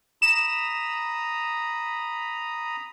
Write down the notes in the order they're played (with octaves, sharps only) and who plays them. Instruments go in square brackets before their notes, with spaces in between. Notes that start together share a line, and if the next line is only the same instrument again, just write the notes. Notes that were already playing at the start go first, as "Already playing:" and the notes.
[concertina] A#5 B5 D#6 [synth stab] E7